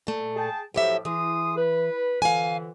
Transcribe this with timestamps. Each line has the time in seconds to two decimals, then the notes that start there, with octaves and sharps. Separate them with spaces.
0.07 A#2 A3
0.37 G#4 G5 A5
0.74 A2 F3 F#3 G4 E5
1.05 E3 G#4 C6 D#6
1.57 B4
2.22 F2 D3 E3 F5 G#5